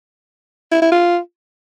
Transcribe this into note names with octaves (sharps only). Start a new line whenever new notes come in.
E4
E4
F4